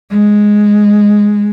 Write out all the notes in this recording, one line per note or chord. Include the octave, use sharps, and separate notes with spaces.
G#3